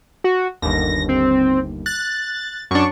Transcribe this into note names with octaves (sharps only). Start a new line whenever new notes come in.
F#4
G1 D#2 A#6
C4
F#6 A6
F#2 D4 C#6